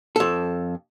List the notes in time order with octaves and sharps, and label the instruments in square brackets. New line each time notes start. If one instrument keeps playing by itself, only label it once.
[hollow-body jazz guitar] F2 A4